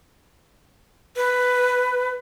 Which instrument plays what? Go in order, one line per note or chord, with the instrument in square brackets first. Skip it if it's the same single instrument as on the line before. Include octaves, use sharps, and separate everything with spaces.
[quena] B4